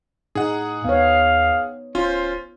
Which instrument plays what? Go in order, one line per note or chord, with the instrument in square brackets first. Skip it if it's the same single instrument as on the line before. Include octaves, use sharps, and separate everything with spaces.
[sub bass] A2 [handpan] D#4 [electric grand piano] G#4 F#5
[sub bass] D#2 [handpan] B3 C#5 [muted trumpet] F5
[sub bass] D1 [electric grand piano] C#4 F4 [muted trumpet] C5